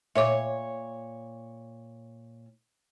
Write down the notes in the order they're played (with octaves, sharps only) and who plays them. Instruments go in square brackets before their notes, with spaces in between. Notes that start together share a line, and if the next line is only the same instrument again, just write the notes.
[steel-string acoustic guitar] A#2 C#5 [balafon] E5 D6